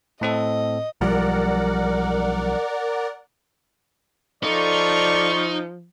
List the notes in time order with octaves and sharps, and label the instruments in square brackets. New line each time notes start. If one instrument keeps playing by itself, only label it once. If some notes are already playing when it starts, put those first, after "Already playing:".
[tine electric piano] A2 C4 A4 [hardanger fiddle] D#5
[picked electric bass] B1 F3 G3 [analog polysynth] A#4 D5 F#5
[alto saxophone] F3 [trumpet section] G3 F4 C#6 [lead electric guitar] D#4 [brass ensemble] A4 D5